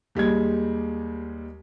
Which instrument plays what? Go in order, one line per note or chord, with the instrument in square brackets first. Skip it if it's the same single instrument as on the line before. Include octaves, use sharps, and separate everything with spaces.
[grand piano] D#2 G3 G#3 G#6